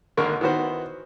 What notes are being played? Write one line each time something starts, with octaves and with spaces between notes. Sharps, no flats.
G#1 D3 A#3 A#4 C#6
D#3 E3 B3 F#4 C5